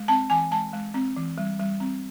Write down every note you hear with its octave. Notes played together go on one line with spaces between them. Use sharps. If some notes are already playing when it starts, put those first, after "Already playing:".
Already playing: G#3
C4 A5
E3 G#5
G#3 A5
G#3
C4
E3
G3
G3
C4